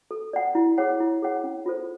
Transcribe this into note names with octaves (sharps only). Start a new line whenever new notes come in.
A4
D5 F#5
E4
G#4 C#5 F#5
E4
G#4 C#5 F#5
C#4
F4 A4 C5